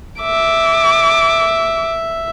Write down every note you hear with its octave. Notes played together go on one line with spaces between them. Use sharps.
E5 D6